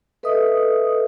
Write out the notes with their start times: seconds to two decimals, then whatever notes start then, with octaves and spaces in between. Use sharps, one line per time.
0.23 A4 B4 D#5 E5 D#6